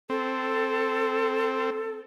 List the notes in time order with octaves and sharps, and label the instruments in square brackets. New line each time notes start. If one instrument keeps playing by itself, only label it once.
[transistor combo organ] C4 [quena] A4